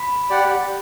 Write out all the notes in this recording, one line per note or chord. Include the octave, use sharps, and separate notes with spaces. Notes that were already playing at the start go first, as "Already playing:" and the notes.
Already playing: B5
G4 D5 F#5